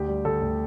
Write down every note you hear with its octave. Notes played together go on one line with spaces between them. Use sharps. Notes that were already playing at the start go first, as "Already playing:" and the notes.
Already playing: D2 G4
G3
D2 A4
D2